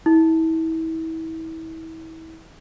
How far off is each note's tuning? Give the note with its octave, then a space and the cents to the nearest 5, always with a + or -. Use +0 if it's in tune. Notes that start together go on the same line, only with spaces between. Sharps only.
E4 -35